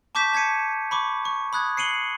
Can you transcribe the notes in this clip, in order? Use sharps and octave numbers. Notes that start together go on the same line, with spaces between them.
A5 C#6 D6 G6 B6 E7
A5 G#6 B6 C#7 D#7
B5 C#6 D6
C#6
B5 D#6 F#6 G#6
C7 C#7 D#7 F#7 G7